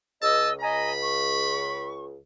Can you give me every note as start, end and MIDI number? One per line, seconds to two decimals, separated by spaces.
0.22 2.18 37
0.22 0.53 75
0.22 0.49 81
0.22 0.53 88
0.60 0.91 75
0.60 0.91 80
0.60 0.91 82
0.60 1.90 83
1.02 2.04 85